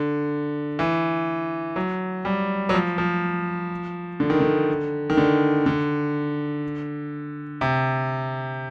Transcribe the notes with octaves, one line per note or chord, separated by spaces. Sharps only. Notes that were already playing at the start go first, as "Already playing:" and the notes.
Already playing: D3
E3
F#3
G3
F#3
F3
F3
D3
D#3
D3
D#3
D3
D3
C3